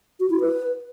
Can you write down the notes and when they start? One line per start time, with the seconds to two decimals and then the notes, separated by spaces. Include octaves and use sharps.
0.20 F#4
0.30 E4
0.40 B4